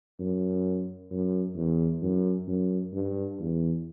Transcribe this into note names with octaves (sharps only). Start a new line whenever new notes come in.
F#2
F#2
E2
F#2
F#2
G2
E2